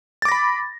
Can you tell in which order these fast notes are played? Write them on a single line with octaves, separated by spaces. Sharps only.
A6 D6 A#6 B5